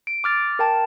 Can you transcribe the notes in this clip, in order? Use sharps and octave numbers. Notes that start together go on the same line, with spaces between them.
D7
D6 F6 A6
A#4 G5 A5